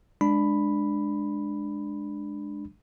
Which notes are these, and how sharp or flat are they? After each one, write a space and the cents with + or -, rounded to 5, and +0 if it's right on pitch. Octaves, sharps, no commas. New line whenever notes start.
G#3 +5 D4 +10 B5 +0